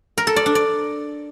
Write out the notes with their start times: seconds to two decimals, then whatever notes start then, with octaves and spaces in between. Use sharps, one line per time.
0.18 A#4
0.27 A4
0.36 D5
0.46 D4
0.55 D5